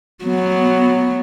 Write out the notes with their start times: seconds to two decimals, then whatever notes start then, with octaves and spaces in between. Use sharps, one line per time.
0.24 F#3 B3